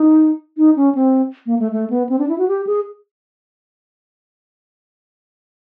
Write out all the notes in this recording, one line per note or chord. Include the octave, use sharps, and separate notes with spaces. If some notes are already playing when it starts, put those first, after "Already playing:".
Already playing: D#4
D#4
C#4
C4
A#3
A3
A3
B3
C4
D4
E4
F#4
G4
G#4